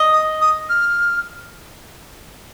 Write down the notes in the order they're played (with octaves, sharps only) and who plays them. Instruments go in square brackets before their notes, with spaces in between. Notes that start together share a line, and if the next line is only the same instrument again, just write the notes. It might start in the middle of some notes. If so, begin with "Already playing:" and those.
Already playing: [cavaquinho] D#5
[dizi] D#6
D#6
F6